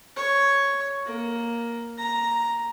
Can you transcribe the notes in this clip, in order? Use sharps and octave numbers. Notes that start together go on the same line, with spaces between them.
C#5
A#3
A#5